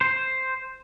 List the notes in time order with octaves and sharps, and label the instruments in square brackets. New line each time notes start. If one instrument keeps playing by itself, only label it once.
[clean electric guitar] C5